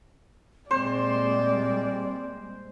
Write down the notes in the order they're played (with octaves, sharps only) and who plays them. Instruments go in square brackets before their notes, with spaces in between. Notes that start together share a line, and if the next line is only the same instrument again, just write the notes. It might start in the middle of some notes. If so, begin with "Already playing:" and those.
[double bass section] A#2 G3 G#3 [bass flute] C4 [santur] C5 [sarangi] D5